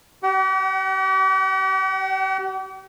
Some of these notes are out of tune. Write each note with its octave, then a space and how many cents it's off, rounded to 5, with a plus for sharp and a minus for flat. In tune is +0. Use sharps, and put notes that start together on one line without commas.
G4 -40 F#5 +40